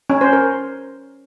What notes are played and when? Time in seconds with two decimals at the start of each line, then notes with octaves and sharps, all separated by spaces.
0.10 C#4
0.21 C5
0.33 A#4